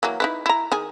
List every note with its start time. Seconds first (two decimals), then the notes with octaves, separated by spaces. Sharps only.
0.03 E3 F#3 A#3
0.20 D#4 E4 B4
0.46 E4 A#5
0.72 D#3 G#4 G#5